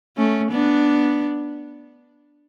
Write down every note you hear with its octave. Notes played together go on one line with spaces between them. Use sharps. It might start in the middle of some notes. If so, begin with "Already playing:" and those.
A3 C#4
B3 D4